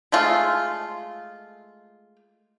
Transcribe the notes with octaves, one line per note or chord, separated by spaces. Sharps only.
G#3 A3 F4